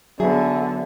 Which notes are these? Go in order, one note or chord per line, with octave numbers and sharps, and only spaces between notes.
D3 F#3 B3 G#4 E5